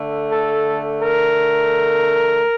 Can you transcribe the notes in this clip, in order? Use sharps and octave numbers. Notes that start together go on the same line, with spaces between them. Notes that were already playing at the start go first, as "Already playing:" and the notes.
Already playing: D3 A3
A4
A#4